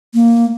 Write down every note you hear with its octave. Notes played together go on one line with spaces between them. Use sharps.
A#3